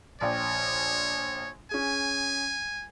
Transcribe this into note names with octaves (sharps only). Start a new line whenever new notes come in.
A#1 C#5 D5 G5
C#4 G#4 G#5